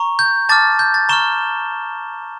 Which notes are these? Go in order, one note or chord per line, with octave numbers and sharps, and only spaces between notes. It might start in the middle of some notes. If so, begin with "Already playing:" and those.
Already playing: A#5 C#6
G6
A5 D6 F6 A6
G6
A6
A#5 C#6 F6 E7 G7